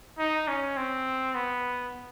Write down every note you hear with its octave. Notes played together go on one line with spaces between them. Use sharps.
D#4
C#4
C4
B3